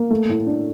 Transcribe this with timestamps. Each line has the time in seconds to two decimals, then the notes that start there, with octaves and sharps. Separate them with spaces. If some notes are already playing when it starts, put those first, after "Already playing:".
Already playing: A#3
0.10 A3
0.29 A2
0.46 D4